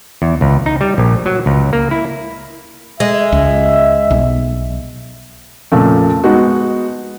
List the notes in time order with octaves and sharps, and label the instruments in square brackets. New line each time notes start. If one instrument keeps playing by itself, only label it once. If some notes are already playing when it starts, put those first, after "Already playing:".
[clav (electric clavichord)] E2
C#2
D#4
G3
A#1
F#3
C#2
A#3
E4
[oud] G#3 [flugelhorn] E5
[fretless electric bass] C#2
B1
[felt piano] F2 A#2 C#3 A3
G#3 B3 D#4 F#4